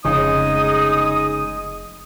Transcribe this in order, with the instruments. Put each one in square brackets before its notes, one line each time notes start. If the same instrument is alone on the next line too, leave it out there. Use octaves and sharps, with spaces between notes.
[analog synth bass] F1 [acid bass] C#3 [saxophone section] G#3 D#4 [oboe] D#6